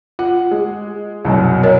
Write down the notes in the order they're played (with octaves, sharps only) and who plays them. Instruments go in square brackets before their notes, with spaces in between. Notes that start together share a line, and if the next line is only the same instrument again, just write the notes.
[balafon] F4 [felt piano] F#5
[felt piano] G#3
C2 F#2 B2
[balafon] A#4 C#5 D#5